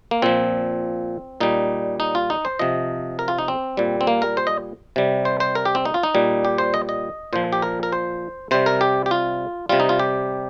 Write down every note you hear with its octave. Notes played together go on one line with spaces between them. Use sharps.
A#3
A#2 F3 C4
A#2 G3 D#4
D#4
F4
D#4
C5
C3 F3 D#5
A#4
F4
D#4
C4
A#2 G3
C4
A#3
A#4
C5
D#5
C3 G3
C5
C5
A#4
G4
C4
D#4
F4
D#4
A#2 G3
G4
C5
D#5
D#5
A#2 F3 C5
G4
A#4
A#4
C5
C3 G3 C5
A#4
G4
G4
F4
C3 G3 F4
D#4
F4
G4